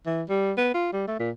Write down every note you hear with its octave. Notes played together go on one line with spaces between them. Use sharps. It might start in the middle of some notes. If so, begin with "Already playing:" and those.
E3
G3
B3
F4
G3
A3
A#2